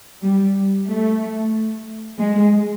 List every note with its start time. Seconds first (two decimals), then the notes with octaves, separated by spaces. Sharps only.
0.22 G3
0.87 A3
2.18 G#3